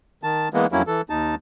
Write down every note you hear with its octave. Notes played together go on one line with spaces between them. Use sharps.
D#3 A5
E3 G#3 A#3 B3
F2 F#3 A#3 C#4 E4
E3 A4
D#2 D#4 A5